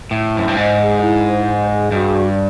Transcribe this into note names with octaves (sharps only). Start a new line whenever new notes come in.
A2 E4
F#2 C5
G2
G#2 D#5
G#4
E4
C5
D#5
G#4
G2 F#4
D5